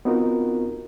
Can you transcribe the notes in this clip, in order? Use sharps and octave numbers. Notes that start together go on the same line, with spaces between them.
B3 C4 D#4 F4 F#4 A#4